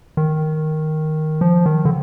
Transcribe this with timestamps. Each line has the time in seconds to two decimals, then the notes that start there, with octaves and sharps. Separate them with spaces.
0.17 D#3
1.41 F3
1.66 D#3
1.85 D3